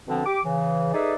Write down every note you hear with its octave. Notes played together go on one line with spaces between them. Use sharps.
B2 D3 F3 C4 D4
G4 D6
C#3 E3
D#4 G#4 A4 B4 D5 E5